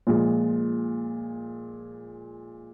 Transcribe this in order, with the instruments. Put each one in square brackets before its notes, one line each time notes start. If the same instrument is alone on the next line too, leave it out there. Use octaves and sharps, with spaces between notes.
[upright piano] A#2 F3 G#3